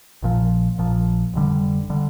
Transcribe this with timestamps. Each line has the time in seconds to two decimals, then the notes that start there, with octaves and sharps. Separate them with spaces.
0.22 A#1 A#2 F3
0.78 A#1 A#2 F3
1.34 F1 F2 D3 G3
1.90 D3 G3